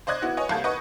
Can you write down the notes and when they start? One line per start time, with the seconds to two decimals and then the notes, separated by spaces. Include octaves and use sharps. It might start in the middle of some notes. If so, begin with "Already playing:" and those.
0.07 C5 D5 D#5 F#6 G#6
0.22 B3 E4 F#4
0.37 B4 C#5 D#5 G#5
0.49 C2 A#3 A4 G6 G#6
0.64 B4 D#5 F#5 C#6 D#6